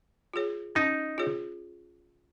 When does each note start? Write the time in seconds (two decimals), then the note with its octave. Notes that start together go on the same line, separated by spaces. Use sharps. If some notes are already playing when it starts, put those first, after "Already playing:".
0.34 F4 G#4 C#5
0.75 C#4 D#4
1.18 F4 G#4 C#5